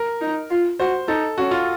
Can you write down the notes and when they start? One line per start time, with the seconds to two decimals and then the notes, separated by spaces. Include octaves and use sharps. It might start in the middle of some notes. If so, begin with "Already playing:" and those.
Already playing: A#4
0.21 D#4
0.50 F4
0.80 F#4 C5
1.08 D#4 A4
1.38 C#4 F#4
1.51 F4